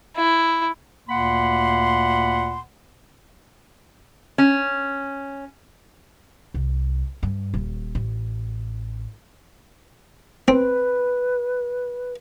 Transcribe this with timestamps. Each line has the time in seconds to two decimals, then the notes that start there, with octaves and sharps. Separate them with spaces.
0.16 E4
1.08 D2 A#2 A#3 F#5 B5 C6
4.38 C#4
6.54 C2
7.23 G2
7.54 D#1
7.95 A1
10.48 C4 B4